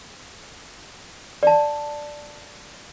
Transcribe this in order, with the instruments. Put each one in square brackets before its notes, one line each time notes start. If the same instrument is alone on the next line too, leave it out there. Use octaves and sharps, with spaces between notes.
[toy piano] D5 A5